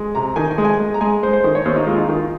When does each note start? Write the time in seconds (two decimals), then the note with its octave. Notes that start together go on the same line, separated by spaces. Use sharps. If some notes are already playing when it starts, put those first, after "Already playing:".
Already playing: G#3
0.15 C3 A#5
0.36 D#3 G#5
0.51 G#5
0.58 G#3
0.65 G#5
0.80 G#3
0.94 A#5
1.01 G#3 G#5
1.23 G#3 C5
1.33 C5
1.44 D#3 C5
1.55 C#5
1.65 D#2 C5
1.76 D#4
1.87 G#3 F4
1.98 D#4
2.09 D#3 F4